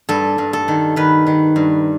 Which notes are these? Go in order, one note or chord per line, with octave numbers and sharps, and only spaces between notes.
G2 A4
G2
A4
D#3
D#3 B4
D#3
G2